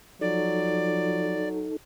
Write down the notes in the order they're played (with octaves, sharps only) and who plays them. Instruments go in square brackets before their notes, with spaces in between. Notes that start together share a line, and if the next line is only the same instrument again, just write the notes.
[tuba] F3 [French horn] F#3 [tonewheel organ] D#4 A4 [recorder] D5